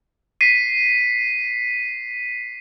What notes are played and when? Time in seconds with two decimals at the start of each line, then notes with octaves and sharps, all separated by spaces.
0.41 B6 C7 D#7